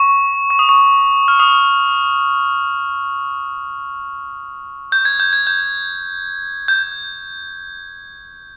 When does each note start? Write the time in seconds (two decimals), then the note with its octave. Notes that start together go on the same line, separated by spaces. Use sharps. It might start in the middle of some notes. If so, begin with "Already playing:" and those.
Already playing: C#6
0.50 C#6
0.59 D#6
0.69 C#6
1.28 F6
1.39 D#6
4.92 G6
5.05 G#6
5.20 G6
5.33 G#6
5.47 G6
6.68 G6